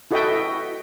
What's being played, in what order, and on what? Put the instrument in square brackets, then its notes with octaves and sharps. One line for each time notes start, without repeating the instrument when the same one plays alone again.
[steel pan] E4 F#4 A4 D#5 E5 G5